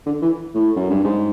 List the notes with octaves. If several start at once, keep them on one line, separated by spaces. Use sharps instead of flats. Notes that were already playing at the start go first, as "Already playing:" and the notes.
D3
E3
A2
F#2
G2
G#2